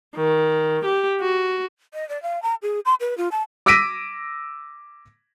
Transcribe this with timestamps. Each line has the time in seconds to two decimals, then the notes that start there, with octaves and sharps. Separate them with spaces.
0.16 D#3
0.85 G4
1.21 F#4
1.94 D#5
2.09 D5
2.23 F5
2.43 A#5
2.62 G#4
2.85 C6
3.00 B4
3.18 F4
3.32 A5
3.66 D6 E6 A#6 B6 D7 D#7